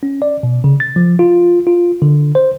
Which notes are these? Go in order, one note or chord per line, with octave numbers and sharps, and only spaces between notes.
C#4
D5
B2
C#3
A6
F3
F4
F4
D3
C5